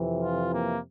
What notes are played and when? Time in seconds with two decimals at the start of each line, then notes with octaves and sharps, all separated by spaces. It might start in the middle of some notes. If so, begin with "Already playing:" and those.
Already playing: F2 C3 E3
0.23 F4
0.53 A#3